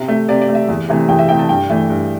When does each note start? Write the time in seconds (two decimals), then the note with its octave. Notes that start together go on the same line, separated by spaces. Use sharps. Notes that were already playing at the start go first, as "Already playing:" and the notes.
Already playing: C3
0.08 A3
0.28 C3 D5
0.42 D5
0.49 A3
0.55 E5
0.69 E2
0.89 C3 E3 A3
1.08 E2 G5
1.19 E5
1.29 C3 E3 A3 G5
1.39 A5
1.49 G2 G5
1.70 E3 A3
1.89 G2